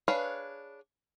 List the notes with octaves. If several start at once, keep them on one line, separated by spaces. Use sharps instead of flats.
D4 G#4 B4 C#5 F5